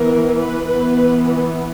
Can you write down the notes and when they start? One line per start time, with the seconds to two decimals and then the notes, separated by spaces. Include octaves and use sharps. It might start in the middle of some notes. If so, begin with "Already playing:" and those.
Already playing: E3 B3 A#4
0.40 B4
0.70 E3 B3 B4